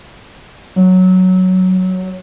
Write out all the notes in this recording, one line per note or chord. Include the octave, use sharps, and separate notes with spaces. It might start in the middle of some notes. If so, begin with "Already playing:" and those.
F#3